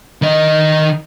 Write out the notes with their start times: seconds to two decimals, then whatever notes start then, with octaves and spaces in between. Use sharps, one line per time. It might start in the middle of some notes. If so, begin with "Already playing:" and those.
0.22 D#3 D#5